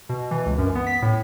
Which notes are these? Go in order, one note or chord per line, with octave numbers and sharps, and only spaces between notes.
B2
E3
C#2
F#2
B3
B6
A2